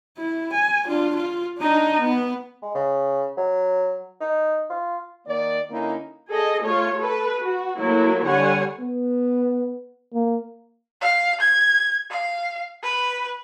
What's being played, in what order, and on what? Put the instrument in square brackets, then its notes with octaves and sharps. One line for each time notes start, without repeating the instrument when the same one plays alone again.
[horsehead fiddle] E4
G#5
D4 F4
F4
D4 D#4
B3
[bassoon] G#3
C#3
F#3
D#4
F4
[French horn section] D#3 A#3 D5
D3 A#3 C#4 D#4 E4
[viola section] G#4 A4 D#5
A3 F4 C#5
A4 B4
F#4
F#3 A3 A#3 E4
D3 G3 C#5 F#5 G#5
[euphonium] B3
A#3
[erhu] F5
G#6
F5
B4